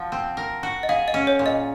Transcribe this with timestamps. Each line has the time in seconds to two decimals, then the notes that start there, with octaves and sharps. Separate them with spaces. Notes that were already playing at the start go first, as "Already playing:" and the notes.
Already playing: F3 F#4
0.12 C4
0.37 A#4
0.63 F#4
0.83 D#5
0.89 G#4 F5
1.08 D#5
1.14 C#4
1.27 C#5
1.39 A#2
1.46 D#5